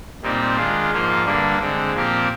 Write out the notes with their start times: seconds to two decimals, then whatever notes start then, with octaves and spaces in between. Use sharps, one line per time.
0.22 A#2 G3 C4 D#4
0.57 D#3 G#3 D4 F4
0.91 G#2 F3 A#3 F4
1.25 G2 D3 G3 A#3 D4
1.59 D3 G#3 C4
1.93 A#2 F3 C4 G4 A#4